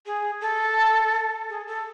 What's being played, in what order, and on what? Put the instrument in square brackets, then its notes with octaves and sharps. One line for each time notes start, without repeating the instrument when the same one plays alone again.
[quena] G#4
A4
G#4
A4